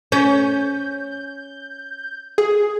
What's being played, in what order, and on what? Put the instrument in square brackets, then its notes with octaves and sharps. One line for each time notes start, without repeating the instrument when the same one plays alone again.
[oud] C#4 [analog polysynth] G6
[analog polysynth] G#4